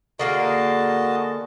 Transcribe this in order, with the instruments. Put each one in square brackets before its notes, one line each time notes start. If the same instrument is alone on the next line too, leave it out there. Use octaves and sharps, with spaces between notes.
[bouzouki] D3 A#3 G#4 [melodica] F#4 D#5 A5